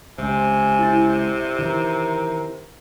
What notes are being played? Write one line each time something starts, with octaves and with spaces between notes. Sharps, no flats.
C#2 C3 G#5
E4 A6
D#3 E3 A#4